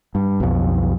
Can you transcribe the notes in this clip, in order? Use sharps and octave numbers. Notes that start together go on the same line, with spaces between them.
G2
B1 F2